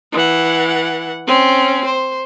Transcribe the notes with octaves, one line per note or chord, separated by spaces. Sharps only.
E3 F#5
C4 C#4
C5